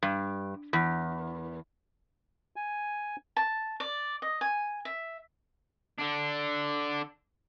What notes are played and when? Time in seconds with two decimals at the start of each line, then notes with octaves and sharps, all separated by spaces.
0.03 G2
0.73 E2
2.56 G#5
3.36 A5
3.80 D5
4.22 D#5
4.41 G#5
4.85 E5
5.99 D3 D4